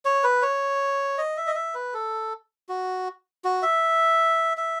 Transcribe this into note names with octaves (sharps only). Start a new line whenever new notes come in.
C#5
B4
C#5
D#5
E5
D#5
E5
B4
A4
F#4
F#4
E5
E5